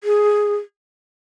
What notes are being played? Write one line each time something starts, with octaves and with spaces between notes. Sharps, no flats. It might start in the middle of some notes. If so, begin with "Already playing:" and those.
G#4